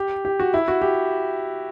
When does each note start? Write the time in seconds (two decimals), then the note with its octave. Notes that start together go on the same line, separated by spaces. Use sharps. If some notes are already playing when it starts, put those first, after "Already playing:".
Already playing: G4
0.25 G4
0.40 F#4
0.54 E4
0.68 F#4
0.82 G4